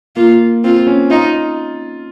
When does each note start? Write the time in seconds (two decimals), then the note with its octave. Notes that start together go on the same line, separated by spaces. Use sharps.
0.16 A#3 F4
0.64 C4 F4
0.87 C#4
1.10 D#4 F4